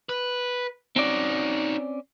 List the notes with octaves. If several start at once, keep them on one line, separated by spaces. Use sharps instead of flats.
B4
C4 C#4 D#4 F#4 D5